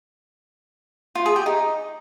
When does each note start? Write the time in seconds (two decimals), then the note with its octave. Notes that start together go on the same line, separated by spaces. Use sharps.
1.15 F4
1.26 G#4
1.36 G4
1.46 D#4